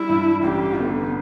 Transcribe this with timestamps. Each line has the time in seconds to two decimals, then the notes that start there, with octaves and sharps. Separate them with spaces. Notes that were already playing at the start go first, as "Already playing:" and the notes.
Already playing: G3 E4
0.09 G2
0.43 A1 G4
0.79 D3 B3